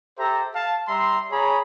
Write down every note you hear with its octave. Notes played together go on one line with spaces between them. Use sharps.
G4 A4 C5 E5 A#5
F5 A5
G3 E5 A#5 C6
G#4 C#5 A#5 B5